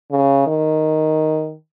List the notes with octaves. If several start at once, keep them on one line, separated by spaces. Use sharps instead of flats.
C#3
D#3